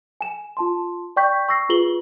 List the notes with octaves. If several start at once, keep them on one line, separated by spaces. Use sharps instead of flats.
G#5 E7
F4 A5 C6
D5 G5 C#6 G6 B6
C#6 E6 A#6 C7
F4 G#4 B4 F#7 G7